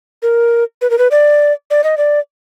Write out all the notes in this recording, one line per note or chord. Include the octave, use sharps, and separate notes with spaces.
A#4
B4
A#4
B4
D5
D5
D#5
D5